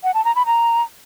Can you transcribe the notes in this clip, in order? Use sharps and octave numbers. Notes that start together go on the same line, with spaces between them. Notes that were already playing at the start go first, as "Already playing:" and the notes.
F#5
A5
A#5
B5
A#5